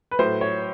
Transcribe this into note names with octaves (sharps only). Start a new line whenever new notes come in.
B4
A2 F#3 C5
C#5